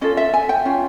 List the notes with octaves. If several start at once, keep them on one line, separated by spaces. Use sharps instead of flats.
C#4 F4 A4 D#5
E5
G#5
G5
C#4 F4